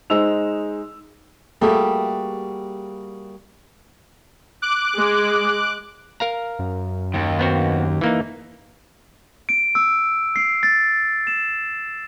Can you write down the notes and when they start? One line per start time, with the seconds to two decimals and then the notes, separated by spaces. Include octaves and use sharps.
0.10 G#3 D#4 C5 E6 F7
1.61 G3 A3 A#3 F#4 G#4 E5
4.62 D6 F#6
4.97 G#3
6.20 A#4 F5 A#5
6.59 F#2
7.14 D#2 D#3
7.39 B3 C4 F#4
8.01 E3 A#3 D#4
9.49 D7
9.75 E6
10.36 C7
10.63 A6
11.27 E7